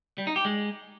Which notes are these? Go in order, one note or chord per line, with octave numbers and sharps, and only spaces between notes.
G3
D#4
G4
G#3